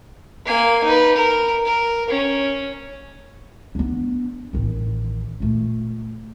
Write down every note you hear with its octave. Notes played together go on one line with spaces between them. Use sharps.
A#3 G#5
D#4 B4
A#4
A#4
C#4
B3 D4
A1 D#3
A#2 A3